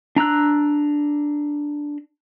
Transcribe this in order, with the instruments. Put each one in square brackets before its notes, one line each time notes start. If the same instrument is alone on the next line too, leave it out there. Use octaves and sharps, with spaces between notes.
[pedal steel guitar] D4 A#5 E6 F#6